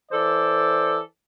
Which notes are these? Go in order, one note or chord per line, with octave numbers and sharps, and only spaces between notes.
E3 A4 C5 D5